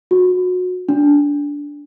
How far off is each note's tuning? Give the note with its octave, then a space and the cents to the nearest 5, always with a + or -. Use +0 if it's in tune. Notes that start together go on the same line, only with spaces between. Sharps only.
F#4 -25
D4 -20